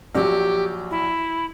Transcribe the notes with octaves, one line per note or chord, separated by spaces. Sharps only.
A#1 F#3 G4
E4